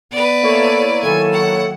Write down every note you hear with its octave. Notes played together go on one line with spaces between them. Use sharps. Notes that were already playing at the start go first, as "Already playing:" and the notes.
B3 B4 D5
A#3 E4 A4 C#5
D#3 F#3 A4 G#5
F#5